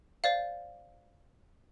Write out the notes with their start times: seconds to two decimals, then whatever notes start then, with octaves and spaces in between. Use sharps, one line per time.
0.24 C5 D5 F5